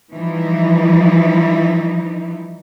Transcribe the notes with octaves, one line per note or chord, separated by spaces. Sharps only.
E3 F3 G3 D#4 E4